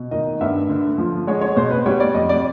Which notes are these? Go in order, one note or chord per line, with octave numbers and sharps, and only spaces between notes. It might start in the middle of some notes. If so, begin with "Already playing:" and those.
Already playing: B2
D#3 D#5
G2 E5
D3
F3
G#3 C#5
C#5
B2 C5
B4
G3 C#5
D5
F2 D#5
D5